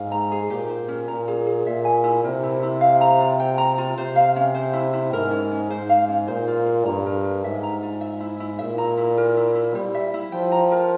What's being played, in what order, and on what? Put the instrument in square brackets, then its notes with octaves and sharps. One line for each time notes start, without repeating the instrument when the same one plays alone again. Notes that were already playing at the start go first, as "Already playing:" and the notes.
Already playing: [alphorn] G#2 [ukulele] F5
[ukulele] A#5
G#4
[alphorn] A#2 [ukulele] G4
[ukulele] C5
C#4
[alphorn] A#2 [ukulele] A#5
[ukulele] G#4
G#4
[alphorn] A#2 [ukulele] E5
[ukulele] G#5
E4
[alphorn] C3 [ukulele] A#4
[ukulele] E4
E4
F5
A#5
F4
G5
A#5
F4
[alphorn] C3 [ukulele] C5
[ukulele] F5
C#4
C5
E4
E4
[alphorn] G#2 [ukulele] A#4
[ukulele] C#4
C#4
[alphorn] G#2 [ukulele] C5
[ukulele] F5
C#4
[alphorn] A#2 [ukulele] C5
[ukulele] F4
F4
[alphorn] G2 [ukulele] A#5
[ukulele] A#4
A#4
[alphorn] G#2 [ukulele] E5
[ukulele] A#5
F4
E5
E4
E4
[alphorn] A#2 [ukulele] E5
[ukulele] A#5
E4
A#4
E4
E4
[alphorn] G3 [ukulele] C5
[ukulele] E5
E4
[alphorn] F3 [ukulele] G5
[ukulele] A#5
A#4